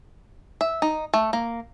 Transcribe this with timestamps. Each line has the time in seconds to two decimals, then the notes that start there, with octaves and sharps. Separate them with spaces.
0.61 E5
0.82 D#4
1.14 A3
1.33 A#3